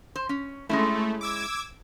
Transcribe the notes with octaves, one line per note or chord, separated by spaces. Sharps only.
C5
C#4
G#3 A3 C#4 E4
D6 E6 G#6